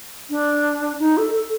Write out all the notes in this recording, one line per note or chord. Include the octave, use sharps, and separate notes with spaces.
D4
D#4
A4
A4